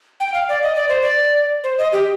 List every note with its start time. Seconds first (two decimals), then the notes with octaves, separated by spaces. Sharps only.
0.20 G5
0.34 F5
0.49 D5
0.63 D#5
0.76 D5
0.89 C5
1.02 D5
1.64 C5
1.78 D#5
1.93 G4